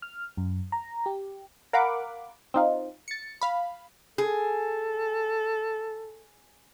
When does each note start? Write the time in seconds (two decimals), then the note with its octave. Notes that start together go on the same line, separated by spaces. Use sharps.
0.02 F6
0.37 F#2
0.72 A#5
1.06 G4
1.73 A#4 F5 F#5 B5 D6
2.54 C4 D#4 F4
3.08 A6 C#7
3.41 F5 B5
4.18 G#4 A4